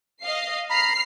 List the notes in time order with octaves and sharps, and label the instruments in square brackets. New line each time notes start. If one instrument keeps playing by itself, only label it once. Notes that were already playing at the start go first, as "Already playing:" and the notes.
[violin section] D#5 F5 C7
[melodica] A#5 B5 [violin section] F6 C7